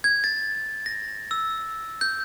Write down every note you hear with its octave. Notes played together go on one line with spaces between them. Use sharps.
G#6
A6
A#6
E6
G6